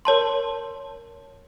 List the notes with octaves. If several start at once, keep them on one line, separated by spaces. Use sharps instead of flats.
A#4 C#5 A5 C6